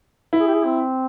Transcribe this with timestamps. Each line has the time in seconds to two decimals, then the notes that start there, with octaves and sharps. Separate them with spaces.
0.33 E4
0.40 G#4
0.47 G4
0.55 G#4
0.65 C4